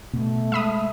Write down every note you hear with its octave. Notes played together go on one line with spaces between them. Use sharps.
B2 A3 B3
G#3 E5 B5 D#6